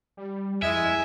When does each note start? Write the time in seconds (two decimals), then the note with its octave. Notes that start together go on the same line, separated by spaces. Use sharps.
0.17 G3
0.62 F2 G#3 E4 E5 G#5